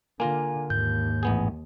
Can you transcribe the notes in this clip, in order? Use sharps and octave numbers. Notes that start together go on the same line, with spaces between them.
D3 A#3 F4 A#4 G#5
D#2 G#2 G6
A1 B3 G#4